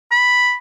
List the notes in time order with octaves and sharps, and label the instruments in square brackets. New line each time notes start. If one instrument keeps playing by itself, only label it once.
[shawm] B5